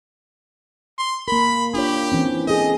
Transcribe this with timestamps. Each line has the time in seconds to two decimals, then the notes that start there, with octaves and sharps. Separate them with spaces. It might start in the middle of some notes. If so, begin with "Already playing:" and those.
0.98 C6
1.28 A#3 A#4 B5
1.74 D4 F4 G4 C#5
2.12 E3 C4 C#4
2.47 G#4 A4 D#5